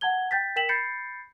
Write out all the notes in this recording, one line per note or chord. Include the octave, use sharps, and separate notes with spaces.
F#5 A5 G#6 G7
G5 G6 A6 B6
A#4 G5 B6 E7 F#7
B5 G6 A6 C7 C#7